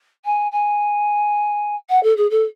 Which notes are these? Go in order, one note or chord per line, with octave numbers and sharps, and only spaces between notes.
G#5
G#5
F#5
A4
G#4
A4